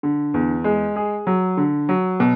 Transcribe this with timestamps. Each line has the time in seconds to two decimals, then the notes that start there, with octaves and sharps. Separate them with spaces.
0.03 D3
0.34 E2
0.64 G#3
0.96 G#4
1.27 F#3
1.57 D3
1.89 F#3
2.20 B2